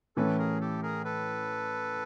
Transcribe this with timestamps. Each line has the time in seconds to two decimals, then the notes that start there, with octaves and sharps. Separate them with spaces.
0.16 A2 E3 A3 C#4 A4 B4
0.38 G#4 A#4
0.60 G4 A4
0.82 G#4 A#4
1.05 A4 B4